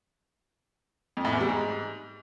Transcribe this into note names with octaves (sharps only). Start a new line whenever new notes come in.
F2
A2
E2
G3
G#2